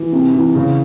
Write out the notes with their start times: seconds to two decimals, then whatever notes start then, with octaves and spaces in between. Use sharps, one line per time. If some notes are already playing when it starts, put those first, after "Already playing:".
Already playing: E3
0.12 C3
0.34 E3
0.55 C#3